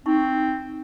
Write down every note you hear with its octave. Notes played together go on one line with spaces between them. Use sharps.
C4 D#4 E4 C#6